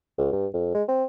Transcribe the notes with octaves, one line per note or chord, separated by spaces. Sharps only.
C#2
G2
F2
G#3
C4